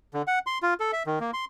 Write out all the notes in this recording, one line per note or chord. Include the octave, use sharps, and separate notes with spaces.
D3
F#5
C6
F4
A4
E5
D#3
A#3
C6